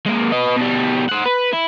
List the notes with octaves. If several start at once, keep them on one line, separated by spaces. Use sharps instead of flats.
G#3 A#3
B4 D#5
B2 G3
C5 F#5
B4
E4